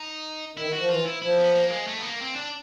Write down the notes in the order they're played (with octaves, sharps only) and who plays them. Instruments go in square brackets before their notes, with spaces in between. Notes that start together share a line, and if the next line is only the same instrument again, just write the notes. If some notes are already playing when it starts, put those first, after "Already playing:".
Already playing: [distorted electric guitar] D#4
[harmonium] D#3 [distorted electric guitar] E4
[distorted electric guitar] F#4
[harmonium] F3
[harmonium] E3 [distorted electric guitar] F4
[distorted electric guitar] E4
[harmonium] F3 [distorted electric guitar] E4
[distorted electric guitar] B3
A#3
G#3
A3
B3
A#3
C4
D4